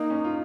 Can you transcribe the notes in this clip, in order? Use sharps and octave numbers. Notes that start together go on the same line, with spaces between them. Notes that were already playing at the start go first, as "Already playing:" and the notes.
Already playing: A#3 D#4
C#4
F4